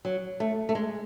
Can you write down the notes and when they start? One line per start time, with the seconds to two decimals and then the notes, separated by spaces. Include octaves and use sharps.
0.05 F#3
0.40 A3
0.69 A3
0.75 G#3